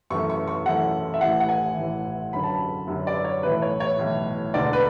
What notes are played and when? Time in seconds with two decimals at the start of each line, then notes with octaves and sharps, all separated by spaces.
0.10 F#2 E3 A3 C#4 C#6
0.30 C#6
0.48 C#6
0.66 F#2 E3 A3 C#4 F#5
1.14 E5
1.21 A1 A2 E3 F#5
1.40 F#5
1.49 G#5
1.76 A1 A2 E3
2.33 F#2 D3 F#3 C#4 B5
2.44 A5
2.55 B5
2.88 F#2 D3 F#3 C#4
3.07 D5
3.24 C#5
3.43 B1 A2 E3 B4
3.62 C#5
3.80 C#5
3.99 B1 A2 E3
4.54 E1 D2 D3 D5
4.73 B4